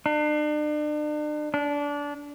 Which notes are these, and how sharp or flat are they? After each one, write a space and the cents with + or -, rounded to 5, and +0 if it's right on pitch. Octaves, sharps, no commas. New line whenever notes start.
D4 +40
D4 -20